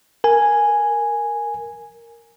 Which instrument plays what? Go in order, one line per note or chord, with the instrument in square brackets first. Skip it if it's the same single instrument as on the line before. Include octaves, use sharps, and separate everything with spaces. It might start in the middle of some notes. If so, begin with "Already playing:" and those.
[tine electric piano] A#4 G#5